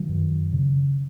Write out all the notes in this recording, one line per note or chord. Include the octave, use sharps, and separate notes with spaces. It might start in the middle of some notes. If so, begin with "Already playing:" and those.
Already playing: D#3 F#3
F#2
C#3